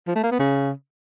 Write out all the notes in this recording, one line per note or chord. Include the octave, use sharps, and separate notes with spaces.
F3
A3
A#3
B3
C#3